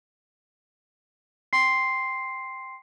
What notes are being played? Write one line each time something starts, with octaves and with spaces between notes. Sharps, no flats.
G5 C6 C7